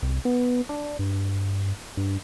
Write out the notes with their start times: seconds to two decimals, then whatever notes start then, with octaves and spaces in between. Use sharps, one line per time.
0.03 C2
0.25 B3
0.69 D4
0.99 G2
1.97 G2